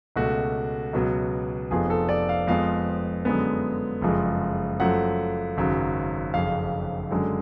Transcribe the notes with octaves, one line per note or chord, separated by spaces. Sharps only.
C#2 B2 A3 F#4
C#2 B2 F#3 B3
F1 F2 F3 B3 G#4
A4
D5
F5
F2 F3 G#3 B3 F5
F#2 D3 G#3 B3
F#1 F2 F3 G#3
F#2 F3 A3 F#5
G#1 F#2 C#3 F#3
F#1 F2 C#3 F5
F#2 D3 G#3